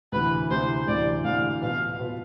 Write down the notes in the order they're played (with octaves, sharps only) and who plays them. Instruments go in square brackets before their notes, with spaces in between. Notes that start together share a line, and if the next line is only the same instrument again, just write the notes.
[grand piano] D2 C3 E3 [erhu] B4
[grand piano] D2 C3 E3 [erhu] C5
[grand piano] D2 C3 E3 [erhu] D5
[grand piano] D2 C3 E3 [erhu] F5
[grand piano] B2 B3 F4 B4 [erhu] F5
[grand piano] B2 B3 F4 B4